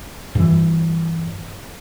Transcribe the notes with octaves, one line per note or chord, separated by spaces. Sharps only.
G2 E3